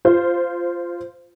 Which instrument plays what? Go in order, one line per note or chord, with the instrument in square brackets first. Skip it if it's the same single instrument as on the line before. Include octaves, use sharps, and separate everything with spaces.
[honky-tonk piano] F4 C5